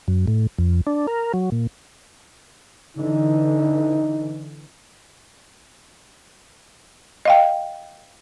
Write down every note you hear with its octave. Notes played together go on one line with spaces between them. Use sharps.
F#2
A2
F2
D4
A#4
F#3
A#2
D3 E3 D#4
D#5 F5 G5